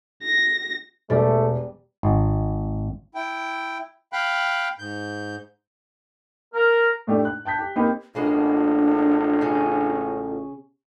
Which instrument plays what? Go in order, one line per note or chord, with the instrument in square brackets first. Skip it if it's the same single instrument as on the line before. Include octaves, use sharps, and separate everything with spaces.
[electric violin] A#6
[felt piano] E1 [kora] G3 [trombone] A3
[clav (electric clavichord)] G#1
[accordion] E4 G5
F5 G5 B5 F#6
G#2 G6
[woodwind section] A#4
[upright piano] A2 A3 D4 G4
F#6
G5 A5 G6 B6
G4
A#3 C4 D#4 G4 B4
[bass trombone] A1 [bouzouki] G#3 A#3 B3 [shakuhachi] D4 [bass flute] F4
[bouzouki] C#3 C#4